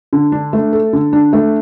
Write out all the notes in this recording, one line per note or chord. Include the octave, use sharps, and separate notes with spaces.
D3
D4
A3
A4
D3
D4
A3